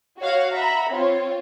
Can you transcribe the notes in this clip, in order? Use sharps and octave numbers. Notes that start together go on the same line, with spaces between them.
F#4 C#5 F5 F#5
E5 F#5 A#5 B5
C4 F4 C#5